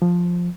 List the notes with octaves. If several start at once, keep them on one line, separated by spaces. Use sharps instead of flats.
F3